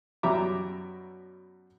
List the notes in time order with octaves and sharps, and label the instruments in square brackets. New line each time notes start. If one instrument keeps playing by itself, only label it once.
[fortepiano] F#2 B2 G3 E5 A#5 D6